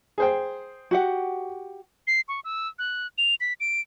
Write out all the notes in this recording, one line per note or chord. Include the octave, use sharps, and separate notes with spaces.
G#4 C5 G5
F#4 G4 F#5
C7
C#6
E6
F#6
F7
B6
D7